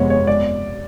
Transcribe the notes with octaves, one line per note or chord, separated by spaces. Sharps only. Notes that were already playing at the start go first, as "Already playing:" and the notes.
Already playing: F2 C3 G#3 B3 C#5
C#5
D5